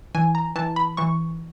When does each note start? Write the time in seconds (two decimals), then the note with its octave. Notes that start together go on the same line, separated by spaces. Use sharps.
0.15 E3 G#5
0.35 A#5
0.56 E3 A5
0.76 B5
0.97 E3 C#6